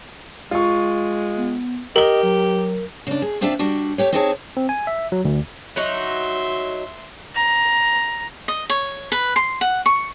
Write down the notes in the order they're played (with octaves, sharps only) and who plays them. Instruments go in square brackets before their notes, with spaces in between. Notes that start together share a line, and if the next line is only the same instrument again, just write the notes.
[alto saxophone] G#3 [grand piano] F4 C#6
[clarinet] B3
[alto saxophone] G4 [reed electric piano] A#4 [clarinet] D#5 [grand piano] F#7 G7
[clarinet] F#3
[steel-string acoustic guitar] C#3 D4
G#4
D#2 C4 D4 F4 D5 E5
G3 D4 F#4
A3 G4 C#5
C4 D#4 E4 G#4 C#5 A5
[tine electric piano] C4
G#5
E5
F#3
D2
[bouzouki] F#3 D#4 [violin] E5 C6
[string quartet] A#5
[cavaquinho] D#5
C#5
B4
C6
F#5
C#6